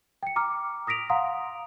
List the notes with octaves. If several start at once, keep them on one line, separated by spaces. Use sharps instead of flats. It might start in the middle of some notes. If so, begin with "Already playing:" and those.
G5 C#7
A#5 D6 F6
D#6 A#6 B6 D7 F7
F5 F#5 A#5 C6 D#6